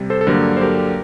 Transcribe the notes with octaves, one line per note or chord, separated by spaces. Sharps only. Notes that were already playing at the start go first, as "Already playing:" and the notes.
Already playing: C3 G3
A4 C5
A4
G2 D3 F#3 A#3 G4 A#4
C5
G4 A#4